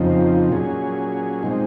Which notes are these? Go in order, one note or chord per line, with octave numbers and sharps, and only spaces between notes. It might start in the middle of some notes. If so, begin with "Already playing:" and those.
Already playing: F2 C#3 F3 C4 D#4
A#2 F#3 C#4 G#4
A#2 G#3 C4 D#4